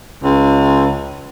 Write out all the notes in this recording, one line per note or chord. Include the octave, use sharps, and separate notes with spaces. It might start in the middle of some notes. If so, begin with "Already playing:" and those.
C#2